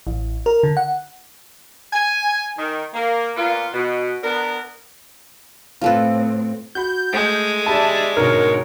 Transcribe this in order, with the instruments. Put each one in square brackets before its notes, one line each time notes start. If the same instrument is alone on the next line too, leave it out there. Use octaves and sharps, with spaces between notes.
[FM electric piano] A1
A#4
D3
F#5
[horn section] G#5
D#3
A#3
A#2 A#3 B3 F4
B2
B3 D4 A#4
[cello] A2 C4 [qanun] F4 A4 B4
[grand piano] F#4 B5 [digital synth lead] G6
[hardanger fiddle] G#3 [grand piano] A3
[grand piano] G4 B5 [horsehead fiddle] D5 E5 [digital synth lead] A5
[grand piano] G#2 B2 D3 [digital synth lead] A#4 [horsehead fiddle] C#5